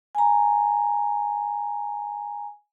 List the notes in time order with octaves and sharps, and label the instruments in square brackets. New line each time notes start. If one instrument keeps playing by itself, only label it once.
[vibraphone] G#5 A#5